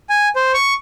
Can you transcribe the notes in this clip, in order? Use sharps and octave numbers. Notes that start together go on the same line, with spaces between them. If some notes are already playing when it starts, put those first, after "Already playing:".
G#5
C5
C#6